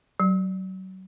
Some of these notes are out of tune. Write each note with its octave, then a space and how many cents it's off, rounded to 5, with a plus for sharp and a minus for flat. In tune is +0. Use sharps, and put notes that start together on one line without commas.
F#3 +30